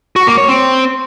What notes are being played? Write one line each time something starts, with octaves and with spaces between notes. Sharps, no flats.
F#4
A#3
C#5
C4